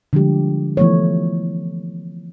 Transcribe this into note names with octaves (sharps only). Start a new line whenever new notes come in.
D3 F3 G3 G#3 G4
E3 F3 A3 B3 C#5